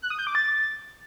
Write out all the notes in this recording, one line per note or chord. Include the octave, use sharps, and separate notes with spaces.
F#6
D#6
G6
D6
A6